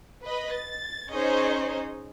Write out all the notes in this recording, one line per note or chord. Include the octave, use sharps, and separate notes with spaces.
B4 D#5 B5
A6
C#4 D#4 G#4 C5 C#5 D#5